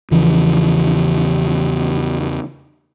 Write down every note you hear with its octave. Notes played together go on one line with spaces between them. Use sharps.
E2 C#3 E3 F3